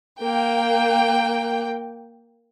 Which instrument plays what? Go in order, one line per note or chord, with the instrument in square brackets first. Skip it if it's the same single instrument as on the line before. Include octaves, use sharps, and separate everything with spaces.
[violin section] A#3 G5